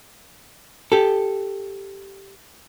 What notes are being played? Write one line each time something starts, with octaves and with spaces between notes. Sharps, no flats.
G4 A4